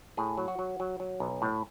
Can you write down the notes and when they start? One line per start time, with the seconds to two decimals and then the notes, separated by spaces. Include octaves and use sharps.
0.17 A2 G#4
0.37 F#3
0.48 F#4
0.59 F#3
0.80 F#3
1.00 F#3
1.20 B1
1.42 A2